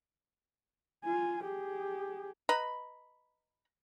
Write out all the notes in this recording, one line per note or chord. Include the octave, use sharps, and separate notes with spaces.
F4 G#5
G4 G#4
B4 D#5 A#5 B5